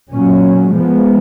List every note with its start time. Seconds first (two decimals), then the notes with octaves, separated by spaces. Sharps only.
0.11 A#2 F#3 C#4
0.73 F3 G#3 B3